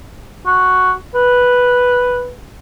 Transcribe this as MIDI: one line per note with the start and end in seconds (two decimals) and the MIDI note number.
0.46 0.92 66
1.14 2.30 71